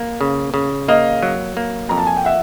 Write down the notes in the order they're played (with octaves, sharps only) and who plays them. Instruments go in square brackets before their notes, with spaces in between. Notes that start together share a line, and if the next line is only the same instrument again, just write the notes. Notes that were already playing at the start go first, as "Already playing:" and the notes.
Already playing: [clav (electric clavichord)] A#3
C#3
C#3
[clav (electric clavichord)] A#3 [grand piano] D#5 F5
[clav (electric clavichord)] F#3
A#3
[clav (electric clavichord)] F2 [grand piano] A#5
[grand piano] A5
G#5
G5
E5 F#5